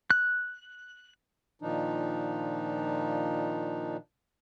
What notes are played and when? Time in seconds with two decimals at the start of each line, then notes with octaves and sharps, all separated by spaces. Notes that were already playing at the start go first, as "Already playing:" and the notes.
0.11 F#6
1.62 A#2 D#3 F3 D4 D#4